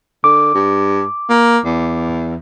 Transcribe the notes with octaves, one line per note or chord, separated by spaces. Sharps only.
D3 D6
G2
A#3
E2